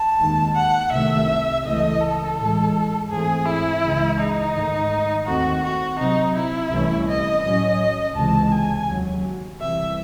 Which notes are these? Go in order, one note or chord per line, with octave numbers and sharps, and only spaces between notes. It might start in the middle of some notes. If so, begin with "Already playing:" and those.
Already playing: A5
D#2 D#3 G#3
F#5
C2 C3 D#3 A3 E5
C#2 C#3 E3 A3 D#5
A4
A2 E3 G#3
G#2 E3 A3 C4 G#4
E4
C#2 C#3 E3 G#3
D#4
G#2 D#3 A3
D#2 D#3 A3 C4 F#4
F#4
C3 F#3 C4 D#4
E4
C2 C3 E3 A3 C#4
D#5
A2 F#3 C#4 D#5
C#2 C3 E3 G#3 A5
G#5
D#2 C#3 F#3
C2 C3 E3 E5